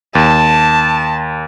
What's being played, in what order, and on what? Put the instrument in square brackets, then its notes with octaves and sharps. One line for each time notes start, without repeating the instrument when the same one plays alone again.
[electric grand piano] D#2 [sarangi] A5